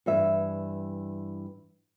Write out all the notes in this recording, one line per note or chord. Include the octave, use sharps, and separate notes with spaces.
G2 E3 E5